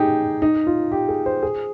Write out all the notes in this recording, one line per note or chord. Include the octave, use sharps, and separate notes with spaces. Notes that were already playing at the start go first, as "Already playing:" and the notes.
Already playing: D#4 G4 G#4
D#4
F4
G4
G#4
C5
G#4